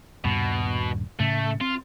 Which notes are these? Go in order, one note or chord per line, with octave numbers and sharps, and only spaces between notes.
D#1 G2 B2
A2 C#3 A3
C4 F4